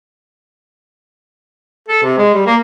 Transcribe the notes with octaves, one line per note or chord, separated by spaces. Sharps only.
A4
C3
G#3
G3
A#3